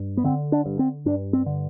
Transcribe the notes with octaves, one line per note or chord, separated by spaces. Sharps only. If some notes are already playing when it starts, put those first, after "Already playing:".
Already playing: G2
B3
D3 C4
D4
G2
C4
G2 D4
C4
D3